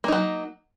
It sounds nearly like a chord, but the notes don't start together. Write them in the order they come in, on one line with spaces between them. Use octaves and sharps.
A#3 D#4 F#3